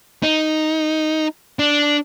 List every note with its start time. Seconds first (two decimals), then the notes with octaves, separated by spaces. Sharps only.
0.23 D#4
1.59 D4